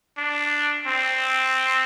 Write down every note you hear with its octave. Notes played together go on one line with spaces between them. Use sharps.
D4
C4